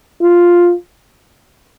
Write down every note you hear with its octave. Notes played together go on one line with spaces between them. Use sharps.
F4